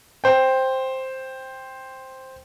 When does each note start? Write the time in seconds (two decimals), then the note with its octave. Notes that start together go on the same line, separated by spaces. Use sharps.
0.24 C5 G5